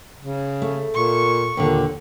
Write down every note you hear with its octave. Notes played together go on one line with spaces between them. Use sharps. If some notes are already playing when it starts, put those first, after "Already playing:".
C#3
A3
A#2 C#6
D#2 A#2 D3